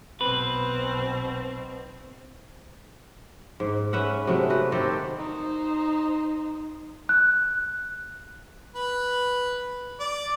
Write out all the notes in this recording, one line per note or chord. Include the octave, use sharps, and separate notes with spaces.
B1 B2 C4 B4
G#2
C#4 B4 E5 F#5
C3 F#3 G#3 A3
F#4 B4
D#3 C4 G4 A4
D#4 C5
F#6
B4
D5